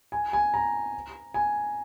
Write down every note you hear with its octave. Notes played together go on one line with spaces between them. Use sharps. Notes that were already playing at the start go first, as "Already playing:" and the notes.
G#5
G#5
A#5
G#5